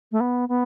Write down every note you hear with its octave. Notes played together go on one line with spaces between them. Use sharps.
A3
B3
B3